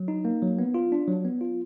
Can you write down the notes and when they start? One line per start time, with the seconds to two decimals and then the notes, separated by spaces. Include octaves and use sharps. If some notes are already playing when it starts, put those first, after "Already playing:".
Already playing: F#3
0.08 D#4
0.25 A#3
0.42 F#3
0.59 B3
0.74 F4
0.92 D4
1.08 F#3
1.25 B3
1.41 F4